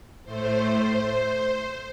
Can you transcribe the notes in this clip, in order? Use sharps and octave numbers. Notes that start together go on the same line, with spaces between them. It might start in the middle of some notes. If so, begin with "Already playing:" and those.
A2 A3 C5